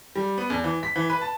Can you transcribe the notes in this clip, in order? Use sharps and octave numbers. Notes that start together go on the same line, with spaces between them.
G3
B3
E2
E3
B6
E3
B4
A5